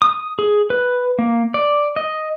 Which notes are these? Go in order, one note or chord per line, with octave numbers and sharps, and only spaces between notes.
D#6
G#4
B4
A#3
D5
D#5